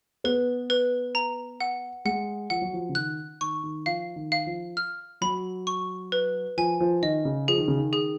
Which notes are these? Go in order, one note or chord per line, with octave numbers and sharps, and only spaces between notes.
B3 B4
B4
A#5
F#5
G#3 F#5
F3 F#5
F#3
F3
C#3
D#3 F#6
D#3 C#6
D#3
F3 F5
D#3
F5
F3
F6
F#3 B5
C#6
B4
F3 G#5
F3
D#3 D#5
C#3
F3 G#4
D#3
C#3
D#3
G#4